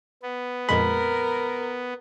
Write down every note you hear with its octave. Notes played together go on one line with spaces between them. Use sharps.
B3
F2 A#2 G#3 A#4 B5